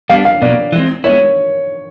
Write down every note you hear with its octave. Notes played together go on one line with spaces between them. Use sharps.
G3 B3 D4 F5
F5
B2 F#3 A#3 D5
E3 G#3 C4
G#3 B3 E4 C#5